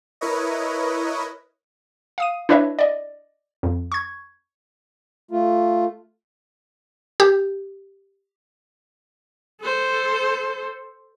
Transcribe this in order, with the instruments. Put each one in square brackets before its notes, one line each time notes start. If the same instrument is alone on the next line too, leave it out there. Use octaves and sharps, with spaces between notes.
[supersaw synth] E4 A#4 B4 C#5 D#5
[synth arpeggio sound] F5 D#6 D#7
D4 E4 B4 C#5 D#5 E5
D5 D#5
F2
C#6 G#6
[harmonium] A3 F4
[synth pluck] G4
[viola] A4 C5